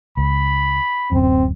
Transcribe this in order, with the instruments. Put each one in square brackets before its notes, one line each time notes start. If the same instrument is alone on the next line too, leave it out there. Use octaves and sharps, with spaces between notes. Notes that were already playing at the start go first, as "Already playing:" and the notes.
[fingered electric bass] C#2 [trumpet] B5
[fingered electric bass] D1 F#2 [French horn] C4